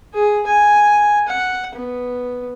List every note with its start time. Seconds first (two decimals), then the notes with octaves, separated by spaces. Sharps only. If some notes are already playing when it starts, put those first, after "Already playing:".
0.14 G#4
0.47 G#5
1.28 F#5
1.75 B3